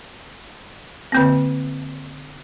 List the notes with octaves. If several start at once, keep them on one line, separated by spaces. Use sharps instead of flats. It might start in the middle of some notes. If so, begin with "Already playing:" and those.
D3 A#3 C4